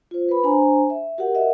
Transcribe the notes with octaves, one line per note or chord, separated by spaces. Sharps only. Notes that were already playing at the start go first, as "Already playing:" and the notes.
F4 C5
B4 B5
D4 C5 G#5 A#5
E5
F#4 G4 A#4 F#5
F#4 A#4 D#5 E5 F#5